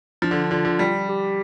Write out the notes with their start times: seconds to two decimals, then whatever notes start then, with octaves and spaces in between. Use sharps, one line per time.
0.22 F3 D4
0.31 D3
0.51 D3 F4
0.65 D3
0.79 G3
1.08 G4